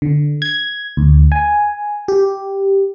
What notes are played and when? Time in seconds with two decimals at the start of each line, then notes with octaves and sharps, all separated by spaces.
0.02 D3
0.42 G#6
0.97 D2
1.32 G#5
2.08 G4